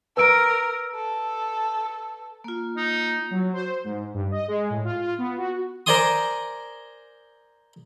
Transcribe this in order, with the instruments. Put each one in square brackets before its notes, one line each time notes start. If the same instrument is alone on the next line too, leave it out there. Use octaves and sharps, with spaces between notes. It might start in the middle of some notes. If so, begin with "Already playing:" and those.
[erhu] A#4 [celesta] B4 E6 D7
[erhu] A4
[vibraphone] A#3 F4
[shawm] D#4
[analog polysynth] F#3
C5
G#2
G2
D#5
G#3
A2
F4
F4
B3
F#4
[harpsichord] A#4 C5 D5 G#5 C6 D#6